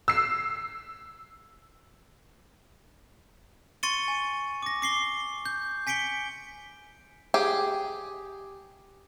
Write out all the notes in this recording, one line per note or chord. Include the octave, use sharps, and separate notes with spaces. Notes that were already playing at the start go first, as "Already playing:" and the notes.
E6 C7
C6 C#6 A6 C#7 D#7 G7
G#5
D6 A#6
D6 C7 G7
G6
G#5 B6 C#7 D7 G7
G4 G#4